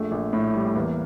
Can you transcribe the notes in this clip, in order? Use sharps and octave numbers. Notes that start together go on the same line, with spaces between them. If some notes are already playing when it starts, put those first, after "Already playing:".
Already playing: A#1 A3
A#1
A2
G3
A3
E2 A#3